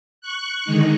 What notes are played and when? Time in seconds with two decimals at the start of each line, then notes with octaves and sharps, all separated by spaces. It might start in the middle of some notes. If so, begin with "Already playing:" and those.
0.21 C#6 F#6
0.64 D3 D#3 G#3 D#4